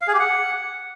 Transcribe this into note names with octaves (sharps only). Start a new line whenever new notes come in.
F5
G#4
G4
F#5